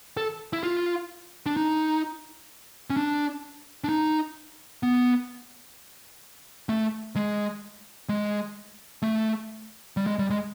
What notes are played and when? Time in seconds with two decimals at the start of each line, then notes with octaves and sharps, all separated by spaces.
0.17 A4
0.53 E4
0.63 F4
1.46 D4
1.57 D#4
2.90 C#4
2.97 D4
3.84 D4
3.89 D#4
4.83 B3
6.69 A3
7.16 G#3
8.09 G#3
9.02 A3
9.97 G3
10.07 G#3
10.19 G3
10.30 G#3